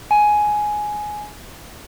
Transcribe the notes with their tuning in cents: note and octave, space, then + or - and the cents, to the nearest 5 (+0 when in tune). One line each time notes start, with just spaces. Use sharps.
G#5 +10